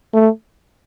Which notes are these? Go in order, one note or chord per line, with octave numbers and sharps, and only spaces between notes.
A3